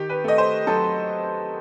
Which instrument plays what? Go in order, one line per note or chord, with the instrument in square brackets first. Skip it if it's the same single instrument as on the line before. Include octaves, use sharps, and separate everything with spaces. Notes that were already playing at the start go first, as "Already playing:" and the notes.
Already playing: [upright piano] D#3 G4
B4
A3 D#5
C5
F#3 A4